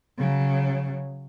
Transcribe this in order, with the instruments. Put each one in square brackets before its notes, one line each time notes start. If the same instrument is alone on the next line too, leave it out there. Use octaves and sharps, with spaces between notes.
[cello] C#3 F#3